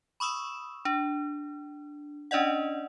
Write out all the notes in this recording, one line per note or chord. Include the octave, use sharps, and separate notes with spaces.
B5 C#6 D#6 E6 E7
D4
C#4 D4 D5 D#5 F#5